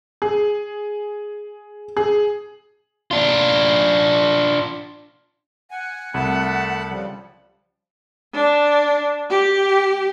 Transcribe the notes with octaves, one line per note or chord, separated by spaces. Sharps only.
G#4
G#4
D4 F4
F#5 G#5
C2 A3 A5 B5
C#3 F3 G3
D4
G4